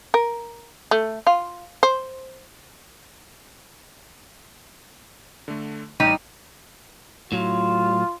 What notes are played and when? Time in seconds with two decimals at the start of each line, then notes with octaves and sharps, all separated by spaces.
0.14 A#4
0.91 A3
1.27 F4
1.83 C5
5.48 D3 A3
6.00 A1 G3 D#4 G4 D#7
7.32 A2 F#3 F4